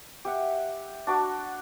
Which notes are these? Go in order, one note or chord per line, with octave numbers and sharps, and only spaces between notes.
G4 E5 F#5
D4 F#4 D5